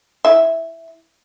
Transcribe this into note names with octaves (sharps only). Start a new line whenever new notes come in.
E4 E5